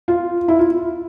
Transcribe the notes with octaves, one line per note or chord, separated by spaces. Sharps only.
F4
E4
F4